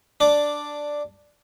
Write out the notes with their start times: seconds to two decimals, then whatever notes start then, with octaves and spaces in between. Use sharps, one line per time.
0.20 D4 D5